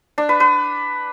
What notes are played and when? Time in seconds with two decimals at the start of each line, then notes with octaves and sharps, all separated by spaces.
0.18 D4
0.29 B4
0.40 B4